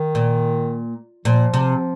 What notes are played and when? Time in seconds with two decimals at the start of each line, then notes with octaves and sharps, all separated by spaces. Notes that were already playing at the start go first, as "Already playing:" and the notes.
Already playing: D#3
0.15 A#2
1.25 A#2 F3
1.54 C3